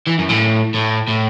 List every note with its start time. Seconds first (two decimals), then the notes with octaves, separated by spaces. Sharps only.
0.07 E3
0.19 F#2
0.29 A2
0.75 A2
1.08 A2